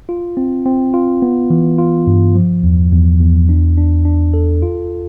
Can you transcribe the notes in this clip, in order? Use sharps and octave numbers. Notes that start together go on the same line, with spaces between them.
F4
C4
C4
F4
B3
E3
F4
G2
F3
E2
E2
E2
D4
D4
D4
A4
F4